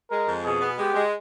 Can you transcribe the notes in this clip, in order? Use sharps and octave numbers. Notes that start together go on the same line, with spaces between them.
G#3 A#4
F2
B2 G#4
B3
G#3 G4
G#3